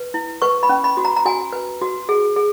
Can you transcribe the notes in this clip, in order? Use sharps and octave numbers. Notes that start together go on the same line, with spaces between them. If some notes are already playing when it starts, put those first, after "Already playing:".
Already playing: B4
E4
B4 C#6
B5
C#4
B5
F#4
A#5
A#5
F#4 G#5
B4
F#4
G#4
G#4